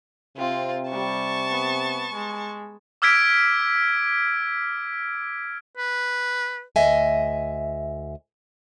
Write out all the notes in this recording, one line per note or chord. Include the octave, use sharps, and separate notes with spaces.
C3 C4 F4
G3 A5 C#6
B3
G#3
D6 E6 F6 G#6 B6 D7
B4
D2 D#5 E5 G#5